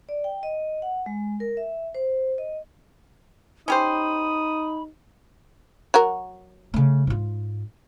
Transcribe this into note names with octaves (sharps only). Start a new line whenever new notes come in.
D5
G5
D#5
F#5
G#3
A#4
E5
C5
D#5
C#4 D#4 G4 C5 B5 D#6
F#3 F#4 A#4
C#3 A3
G#2 F4